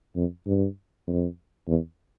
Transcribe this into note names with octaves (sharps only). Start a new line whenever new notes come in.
F2
G2
F2
E2